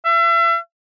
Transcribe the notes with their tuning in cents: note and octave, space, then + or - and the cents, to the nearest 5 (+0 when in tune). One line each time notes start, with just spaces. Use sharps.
E5 +35